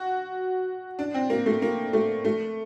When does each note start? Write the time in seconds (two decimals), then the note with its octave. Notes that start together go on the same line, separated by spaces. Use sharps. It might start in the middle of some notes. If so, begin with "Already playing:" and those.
Already playing: F#4
0.99 D4
1.14 C4
1.30 A#3
1.46 A3
1.62 A#3
1.93 A3
2.25 A3